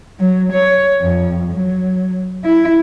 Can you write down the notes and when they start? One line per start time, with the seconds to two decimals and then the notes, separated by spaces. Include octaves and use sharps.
0.20 F#3
0.53 C#5
1.01 F2
1.54 F#3
2.44 E4